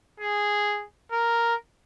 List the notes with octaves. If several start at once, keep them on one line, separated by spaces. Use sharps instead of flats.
G#4
A#4